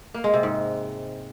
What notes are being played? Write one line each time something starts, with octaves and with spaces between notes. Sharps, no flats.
A#3
G#3
C3
G#2